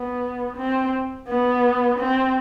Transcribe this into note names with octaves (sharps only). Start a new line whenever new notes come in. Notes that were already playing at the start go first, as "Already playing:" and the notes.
Already playing: B3
C4
B3
C4